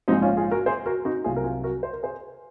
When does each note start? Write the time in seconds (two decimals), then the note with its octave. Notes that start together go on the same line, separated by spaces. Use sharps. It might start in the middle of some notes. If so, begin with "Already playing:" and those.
0.08 A#1 G#2 F3 G#3 C4 D#4
0.22 C#4 F4
0.37 F4 G#4
0.51 F#4 A#4
0.66 G#4 C5
0.86 F#4 A#4
1.05 D#4 F#4
1.24 C2 C3 F#3 F4 G#4
1.36 A#4
1.44 F4 G#4
1.63 F#4 A#4
1.83 C5
1.93 A#4
2.03 G#4 C5